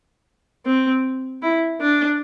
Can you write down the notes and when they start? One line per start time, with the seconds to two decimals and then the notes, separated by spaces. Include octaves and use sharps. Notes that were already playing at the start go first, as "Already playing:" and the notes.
0.66 C4
1.42 E4
1.81 D4